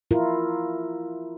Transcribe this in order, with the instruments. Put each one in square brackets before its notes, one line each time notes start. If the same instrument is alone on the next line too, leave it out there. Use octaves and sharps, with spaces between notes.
[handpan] E4 F4 A#4